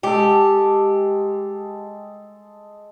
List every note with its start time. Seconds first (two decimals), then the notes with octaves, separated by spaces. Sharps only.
0.03 G#3 G4 A4